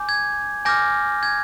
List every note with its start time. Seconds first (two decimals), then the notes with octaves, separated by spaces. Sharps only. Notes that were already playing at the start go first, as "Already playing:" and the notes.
Already playing: G#5 D6 G6
0.09 G#6
0.65 G#5 D6 F6 G6 A#6
1.23 G#6